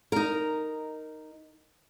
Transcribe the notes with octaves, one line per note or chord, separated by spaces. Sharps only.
D#4 A#4